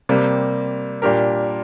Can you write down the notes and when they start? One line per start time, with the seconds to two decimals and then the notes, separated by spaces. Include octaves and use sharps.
0.09 C3 G3 A#3
1.02 A#2 G3 D4 G4 A#4